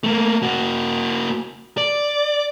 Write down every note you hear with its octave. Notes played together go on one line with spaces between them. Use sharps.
A3 A#3
A#3 F#4
D5